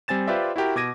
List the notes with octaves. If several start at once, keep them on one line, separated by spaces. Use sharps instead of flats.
G3 C4 G#5 A6 E7
F4 G4 B4 C5 D5 E5
E4 F#4 G4 A#4
B2 D6 G#6 A#6 D#7